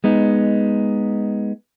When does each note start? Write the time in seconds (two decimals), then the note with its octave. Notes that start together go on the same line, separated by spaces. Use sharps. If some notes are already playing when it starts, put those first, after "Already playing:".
0.04 G#3 B3 D#4